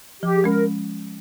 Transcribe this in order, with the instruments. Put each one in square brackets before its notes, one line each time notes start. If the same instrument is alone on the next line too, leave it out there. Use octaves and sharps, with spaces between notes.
[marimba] F3 [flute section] G4
[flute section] G#4
[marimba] G#3 C#4 [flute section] A#4